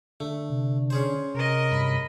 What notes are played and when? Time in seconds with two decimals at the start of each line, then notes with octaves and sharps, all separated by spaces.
0.20 D3 A3
0.50 C3
0.90 C#4 G#4 C5
1.35 C3 A#4 D#5
1.71 G2 B5